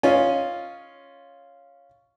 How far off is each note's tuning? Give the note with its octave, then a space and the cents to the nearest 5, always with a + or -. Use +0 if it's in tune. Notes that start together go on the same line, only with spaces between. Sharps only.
C#4 +0 F4 +0 D#5 +0